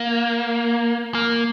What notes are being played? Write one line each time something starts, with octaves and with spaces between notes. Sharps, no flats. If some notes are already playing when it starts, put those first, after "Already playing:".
Already playing: A#3
A#3